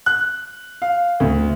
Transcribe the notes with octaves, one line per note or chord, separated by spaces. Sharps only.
F#6
F5
D2